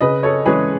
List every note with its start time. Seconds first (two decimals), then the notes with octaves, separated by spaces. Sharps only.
0.01 C#3 B4 D#5
0.23 A4 C#5
0.46 E3 G#3 C#4 G#4 B4